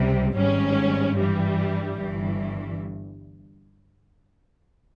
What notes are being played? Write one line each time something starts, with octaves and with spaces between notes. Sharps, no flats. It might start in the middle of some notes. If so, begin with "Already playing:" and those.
Already playing: C#2 C3 G3
G#1 G#2 G3 C#4
G2 E3 G3
G1 G2 E3